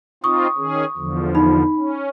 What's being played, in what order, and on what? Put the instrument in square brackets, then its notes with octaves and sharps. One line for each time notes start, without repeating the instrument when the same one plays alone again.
[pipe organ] C4 D#4 F4 [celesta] C#6 D#6
[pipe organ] D#3 C#4 G#4
E2 D3 F3
[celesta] D#4 B5
[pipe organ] C#4